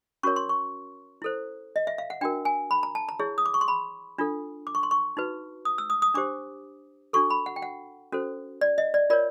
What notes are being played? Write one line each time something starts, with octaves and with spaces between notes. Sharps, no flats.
C#4 F#4 A#4 C#5 C#6
C6
C#6
E4 A4 C5
D#5
E5
F5
F#5
D4 F#4 A#4 G5
G#5
B5
A#5
A5
A#5
E4 G#4 C#5
D#6
D6
C#6
C6
B5
D4 F4 A4
D6
C#6
C6
C#6
D#4 F#4 B4
D#6
E6
D#6
D#6
D4 G4 C5 D6
D4 F#4 A4 C#6
B5
F#5
G5
F#5
C#4 F#4 A4 C5
D5
D#5
D5
F4 A#4 C#5 D5